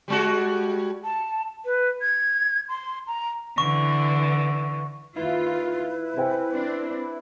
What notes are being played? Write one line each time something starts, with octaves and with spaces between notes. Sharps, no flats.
G3 G#3 F#4
A5
B4
G#6
C6
A#5
D3 E3 C#6
D#2 E4 F4 B4
C3 C5 G5 G#5
C4 D4